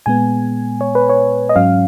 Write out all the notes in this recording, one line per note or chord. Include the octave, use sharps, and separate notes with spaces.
A#2 G#3 B3 G#5
C#5
B4
C#5
D#5
G#2 F#3 C#4 F5